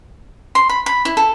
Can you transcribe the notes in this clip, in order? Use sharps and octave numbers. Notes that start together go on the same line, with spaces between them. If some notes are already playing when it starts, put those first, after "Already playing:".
C6
B5
B5
E4
A4